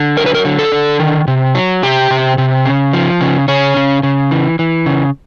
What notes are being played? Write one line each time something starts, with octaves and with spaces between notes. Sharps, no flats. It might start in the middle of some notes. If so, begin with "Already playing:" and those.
Already playing: D3
F#3 A#4
B4
A#4
D3
A4
D3
D#3
C3
F#3
C3 G4
C3
C3
C#3
F3
C#3
C#3 C#4
C#3
C#3
E3
E3
C#3